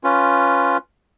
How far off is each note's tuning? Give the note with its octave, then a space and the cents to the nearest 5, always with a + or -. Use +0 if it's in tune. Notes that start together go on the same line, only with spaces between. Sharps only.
C#4 +0 F4 +0 B4 +0